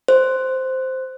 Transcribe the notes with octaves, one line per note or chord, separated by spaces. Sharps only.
C5